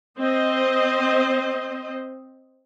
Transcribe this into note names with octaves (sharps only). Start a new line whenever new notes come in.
C4 C5 D#5